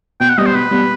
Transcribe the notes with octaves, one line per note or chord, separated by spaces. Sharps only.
B2 G5
F#5
G3 B3 D#5
C5
B2 B4
G3 B3